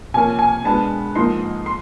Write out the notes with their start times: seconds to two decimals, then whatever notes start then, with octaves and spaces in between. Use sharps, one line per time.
0.14 C3 F3 A#3 C#4 G#5
0.39 G#5
0.64 B2 G#3 B3 D4 A5
1.15 G#2 F3 A#3 D#4 C6
1.66 C6